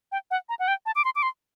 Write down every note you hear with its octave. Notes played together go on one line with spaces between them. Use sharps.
G5
F#5
A#5
F#5
G5
A5
D6
C6
D6
C6